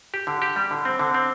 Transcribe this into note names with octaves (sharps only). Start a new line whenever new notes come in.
G4
D3
G4
G3
D3
C4
D3
C4